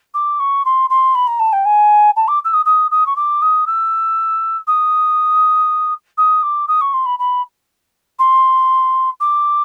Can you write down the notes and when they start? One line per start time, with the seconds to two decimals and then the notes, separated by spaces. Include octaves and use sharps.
0.14 D6
0.40 C#6
0.65 C6
0.90 C6
1.15 B5
1.27 A#5
1.39 A5
1.52 G5
1.65 G#5
2.16 A5
2.28 D6
2.45 E6
2.53 D#6
2.65 D#6
2.91 D#6
3.06 C#6
3.16 D6
3.42 D#6
3.67 E6
4.67 D#6
6.17 D#6
6.43 D6
6.68 D#6
6.81 C#6
6.93 C6
7.06 B5
7.19 B5
8.19 C6
9.20 D6